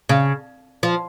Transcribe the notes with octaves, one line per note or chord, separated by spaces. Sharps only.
C#3
F3